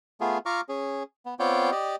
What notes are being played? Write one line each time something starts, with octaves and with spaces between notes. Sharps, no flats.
A3 B3 F4 G#4
F4 A#5 C#6 D6 F6
C#4 G#4
B3
B3 C4 F4 C#5 D5 G5
G4 D5 D#5